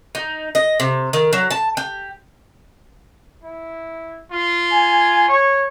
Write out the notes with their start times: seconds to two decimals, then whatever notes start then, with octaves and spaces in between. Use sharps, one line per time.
0.15 D#4
0.55 D#5
0.80 C3
1.13 D#3
1.33 F#3
1.51 A5
1.77 G4
3.43 E4
4.31 F4
4.72 G#5
5.28 C#5